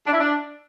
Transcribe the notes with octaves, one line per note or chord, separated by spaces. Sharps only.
D4
E4
D4